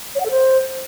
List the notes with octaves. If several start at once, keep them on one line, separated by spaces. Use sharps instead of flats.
C#5
F#5
A4
C5